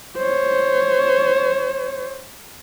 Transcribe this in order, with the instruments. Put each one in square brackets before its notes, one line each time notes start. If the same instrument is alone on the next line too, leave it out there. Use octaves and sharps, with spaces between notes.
[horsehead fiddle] C5 C#5